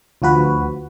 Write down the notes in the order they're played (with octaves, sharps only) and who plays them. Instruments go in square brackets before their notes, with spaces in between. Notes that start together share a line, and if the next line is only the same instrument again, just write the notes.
[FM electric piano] D2 F3 F#4 B4